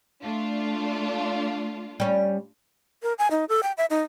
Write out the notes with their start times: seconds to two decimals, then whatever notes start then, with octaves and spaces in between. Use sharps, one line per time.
0.23 A3 D4 F4
2.00 G3 C#4
3.02 A#4
3.18 G#5
3.31 D#4
3.49 A4
3.63 G5
3.77 E5
3.90 D#4